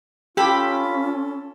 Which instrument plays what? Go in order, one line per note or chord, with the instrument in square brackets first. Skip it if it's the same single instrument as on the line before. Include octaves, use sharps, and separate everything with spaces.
[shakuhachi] C#4 [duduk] F4 [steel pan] G4 [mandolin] A4 B5